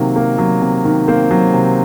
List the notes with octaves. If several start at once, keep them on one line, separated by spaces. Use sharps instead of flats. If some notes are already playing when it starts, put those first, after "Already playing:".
Already playing: C3 D#3 F#3 A#3
A#3
F#3
C3
D#3
A#3 C4 C5
F#3
C3